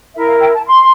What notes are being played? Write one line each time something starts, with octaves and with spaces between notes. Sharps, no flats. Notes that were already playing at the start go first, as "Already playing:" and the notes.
E4 A#4 E5
F5
G5
A5
C6